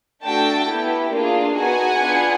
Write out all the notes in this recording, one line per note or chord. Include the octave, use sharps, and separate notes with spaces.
A3 D4 F#4 A4 G5 A5
B3 E4 G4
A#3 D4 F4 G#4
B3 D#4 F#4 F#5 G#5
B3 D4 F4 G#4